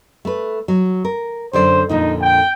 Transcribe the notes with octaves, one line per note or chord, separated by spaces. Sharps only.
A3 B4
F#3
A#4
F#2 D3 C5 D5
F2 A#2 D3 D#4
G5